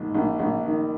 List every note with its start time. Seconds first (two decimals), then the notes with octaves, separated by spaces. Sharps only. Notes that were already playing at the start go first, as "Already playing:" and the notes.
Already playing: A#1 G#2
0.14 A#1
0.39 A#1
0.65 D#3